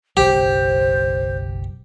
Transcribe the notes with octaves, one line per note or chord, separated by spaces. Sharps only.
F#1 B1 F#3 G4 C5